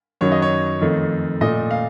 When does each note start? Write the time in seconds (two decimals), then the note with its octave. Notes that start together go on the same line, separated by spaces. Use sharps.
0.21 F#2 D#3 F#3 C#5
0.32 D#5
0.42 C#5
0.81 F2 D#3 A3
1.41 A#2 A3 D#5
1.71 F5